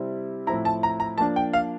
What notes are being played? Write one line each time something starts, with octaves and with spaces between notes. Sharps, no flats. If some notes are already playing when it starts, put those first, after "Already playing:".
Already playing: C3 G3 C4 E4
A2 F3 C4 E4 A#5
A5
A#5
A#5
F3 A#3 D4 A5
G5
F5